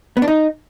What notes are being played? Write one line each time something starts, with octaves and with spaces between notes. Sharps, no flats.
B3
D4
D#4